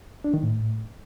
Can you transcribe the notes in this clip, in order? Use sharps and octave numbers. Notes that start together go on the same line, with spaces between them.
D4
D#3
A2